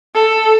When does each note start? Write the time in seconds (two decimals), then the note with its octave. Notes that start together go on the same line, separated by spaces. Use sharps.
0.15 A4